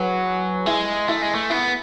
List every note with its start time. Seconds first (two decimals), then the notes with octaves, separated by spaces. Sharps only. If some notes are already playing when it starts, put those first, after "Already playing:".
Already playing: F#3 G#4 B4
0.66 G#3 E4 G#4
1.08 A3 E4
1.22 G#3
1.35 A3
1.50 B3 E4